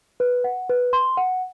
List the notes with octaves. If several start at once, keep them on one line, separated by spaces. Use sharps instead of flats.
B4
F#5
B4
C6
F#5